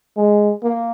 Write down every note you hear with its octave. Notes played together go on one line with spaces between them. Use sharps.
G#3
A#3